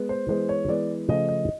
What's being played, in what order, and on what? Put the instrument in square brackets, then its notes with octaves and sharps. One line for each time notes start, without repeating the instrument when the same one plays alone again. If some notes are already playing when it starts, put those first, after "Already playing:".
Already playing: [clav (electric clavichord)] G#3 B3
[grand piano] C5
[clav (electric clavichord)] E3 G#3 B3 [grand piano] C5
[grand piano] C#5
[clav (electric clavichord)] E3 G#3 B3 [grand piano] D5
[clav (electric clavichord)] C#3 F3 A3 [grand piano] D#5
[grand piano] D#5